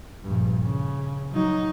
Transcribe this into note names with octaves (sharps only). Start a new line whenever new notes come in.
A#1 G2
C#3
F#3 D#4